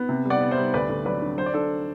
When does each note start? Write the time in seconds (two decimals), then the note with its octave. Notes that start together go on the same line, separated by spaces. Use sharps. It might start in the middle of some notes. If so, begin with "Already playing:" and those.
Already playing: B3
0.09 C3
0.25 G3
0.30 D5 F#5
0.41 B3
0.51 C5 E5
0.57 G3
0.74 D2 B4 D5
0.90 D2
1.05 F#3 B4 D5
1.22 D3
1.38 F#3 C5
1.46 D5
1.54 D4 A4 C5